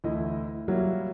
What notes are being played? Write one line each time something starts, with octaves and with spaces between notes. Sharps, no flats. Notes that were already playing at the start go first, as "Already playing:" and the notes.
D2 E3 E4 D#5
F#3 G3 A#3 E4 F#4